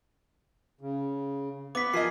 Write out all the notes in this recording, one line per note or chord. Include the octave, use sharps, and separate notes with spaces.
C#3
B3 D6 B6
F3 A#4 D#5 G#5 C7